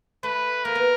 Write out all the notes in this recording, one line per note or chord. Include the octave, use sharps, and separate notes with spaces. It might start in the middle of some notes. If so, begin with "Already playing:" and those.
A3 B4
A#3 A#4
B3